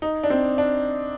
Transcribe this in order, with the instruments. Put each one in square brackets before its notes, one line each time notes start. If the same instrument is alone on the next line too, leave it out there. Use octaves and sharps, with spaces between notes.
[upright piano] D#4
D4
C4
D4